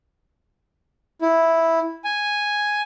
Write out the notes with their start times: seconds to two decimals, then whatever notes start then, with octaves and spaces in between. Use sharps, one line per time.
1.22 E4
2.05 G#5